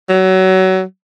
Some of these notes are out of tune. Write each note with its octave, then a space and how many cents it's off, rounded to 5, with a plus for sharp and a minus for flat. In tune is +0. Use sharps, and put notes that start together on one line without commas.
F#3 +25